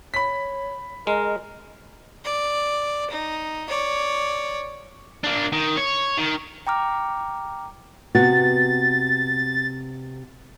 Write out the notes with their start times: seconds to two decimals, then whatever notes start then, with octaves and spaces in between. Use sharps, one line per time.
0.14 C#5 B5 B6
1.07 G#3 A#4 D#5
2.25 D5
3.10 D#4
3.68 C#5 D5
5.24 A#3 D4
5.53 D#3
5.77 C#5
6.17 D#3
6.67 G5 A#5 D6 F6
8.15 C3 B3 F#4 A6